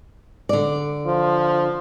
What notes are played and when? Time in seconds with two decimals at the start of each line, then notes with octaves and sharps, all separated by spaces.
0.49 D3 D5
1.06 F3